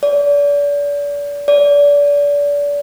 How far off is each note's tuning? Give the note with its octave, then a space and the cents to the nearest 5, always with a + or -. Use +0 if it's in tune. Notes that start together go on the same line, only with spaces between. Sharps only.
D5 -35
D5 -30